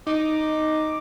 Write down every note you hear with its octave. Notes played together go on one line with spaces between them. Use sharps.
D#4 D6